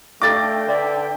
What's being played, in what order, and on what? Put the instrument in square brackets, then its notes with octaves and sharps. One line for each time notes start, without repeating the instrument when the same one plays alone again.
[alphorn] A3 [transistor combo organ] D4 G5 [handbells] A4 F5 A#6 [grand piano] D6 A6
[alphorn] D3 [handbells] B4 D5 E5